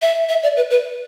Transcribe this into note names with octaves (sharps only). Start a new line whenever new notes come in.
E5
E5
D5
B4
B4